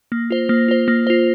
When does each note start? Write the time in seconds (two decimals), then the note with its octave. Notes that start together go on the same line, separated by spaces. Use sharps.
0.12 A#3
0.30 F4 C5
0.49 A#3
0.68 F4 C5
0.88 A#3
1.07 F4 C5